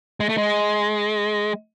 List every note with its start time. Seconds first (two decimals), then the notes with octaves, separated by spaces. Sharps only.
0.20 G#3
0.29 A3
0.38 G#3